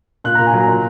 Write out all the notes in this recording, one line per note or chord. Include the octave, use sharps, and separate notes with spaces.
A#2 F#6
A#5
A#2
G#5
F#3 A#5
A#2